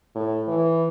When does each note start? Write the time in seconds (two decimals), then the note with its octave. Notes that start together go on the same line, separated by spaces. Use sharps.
0.15 A2
0.48 E3